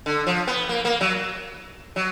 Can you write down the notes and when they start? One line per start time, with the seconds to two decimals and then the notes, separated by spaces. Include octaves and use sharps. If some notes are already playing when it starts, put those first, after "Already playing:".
0.06 D3
0.27 F3
0.47 B3
0.69 A#3
0.85 A#3
1.01 F#3
1.96 F#3